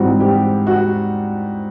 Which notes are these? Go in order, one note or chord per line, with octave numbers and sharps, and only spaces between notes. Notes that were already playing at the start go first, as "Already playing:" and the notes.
Already playing: G#2 E3 G3 C4 F#4
G4
F#4